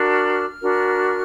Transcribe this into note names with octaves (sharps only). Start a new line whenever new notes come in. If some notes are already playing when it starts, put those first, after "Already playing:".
Already playing: D4 F#4 A#4 F6
D4 F#4 A#4